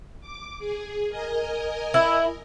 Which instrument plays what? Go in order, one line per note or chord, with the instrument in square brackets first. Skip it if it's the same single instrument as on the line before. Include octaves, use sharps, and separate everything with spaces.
[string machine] D6
G#4
A#4 D#5 G#5
[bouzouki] E4